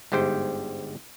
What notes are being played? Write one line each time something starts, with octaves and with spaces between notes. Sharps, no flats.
G1 G#2 G4 C5 G5